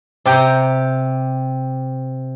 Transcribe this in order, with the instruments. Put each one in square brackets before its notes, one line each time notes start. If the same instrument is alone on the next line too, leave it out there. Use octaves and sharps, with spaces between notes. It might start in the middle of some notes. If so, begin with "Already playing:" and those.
[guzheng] C3 G4 G5 A#5